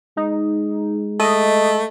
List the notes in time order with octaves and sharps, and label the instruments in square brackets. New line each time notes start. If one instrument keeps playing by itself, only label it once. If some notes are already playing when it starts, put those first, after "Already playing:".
[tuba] G#3 [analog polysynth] D#4
[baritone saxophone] A3 [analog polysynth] D#5